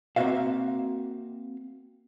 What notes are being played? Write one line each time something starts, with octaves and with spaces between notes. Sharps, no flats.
A#3 C4 C#4 F#4 E5 F5